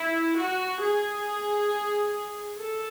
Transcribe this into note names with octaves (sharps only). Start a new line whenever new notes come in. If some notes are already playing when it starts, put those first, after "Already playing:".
Already playing: E4
F#4
G#4
A4